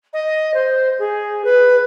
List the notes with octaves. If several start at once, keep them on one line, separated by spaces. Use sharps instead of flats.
D#5
C5
G#4
B4